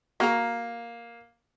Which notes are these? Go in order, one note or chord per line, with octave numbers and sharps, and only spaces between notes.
A#3 F#4 G#4 A#4